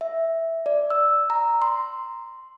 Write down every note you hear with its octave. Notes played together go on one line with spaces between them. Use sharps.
E5
D5
E6
A#5
C6